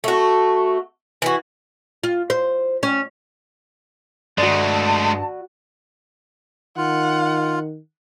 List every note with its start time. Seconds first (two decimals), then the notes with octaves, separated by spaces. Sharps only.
0.04 A3 F#4
1.22 E3 F#4
2.04 F4
2.30 C5
2.83 C#4
4.38 G2 G#3 A3 F#4 D5 A5
6.77 D#3 F4 F#5